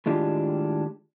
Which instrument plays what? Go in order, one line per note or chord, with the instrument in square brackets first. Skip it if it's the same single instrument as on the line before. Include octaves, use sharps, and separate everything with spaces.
[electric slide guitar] A2 D#3 G#3 D4 F4 G4